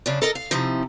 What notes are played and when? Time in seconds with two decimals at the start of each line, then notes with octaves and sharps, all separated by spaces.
0.06 F#2 C#3 D4
0.22 A4 A#4 D#5
0.35 F5
0.51 C3 F3 D#4 E4